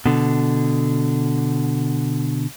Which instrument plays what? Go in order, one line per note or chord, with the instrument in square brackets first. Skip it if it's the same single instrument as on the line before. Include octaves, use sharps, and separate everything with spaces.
[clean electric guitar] B2 D3